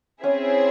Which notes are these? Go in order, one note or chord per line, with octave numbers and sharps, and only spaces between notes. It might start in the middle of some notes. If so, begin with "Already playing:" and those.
C4 C#4 E4 G#4 C5 E5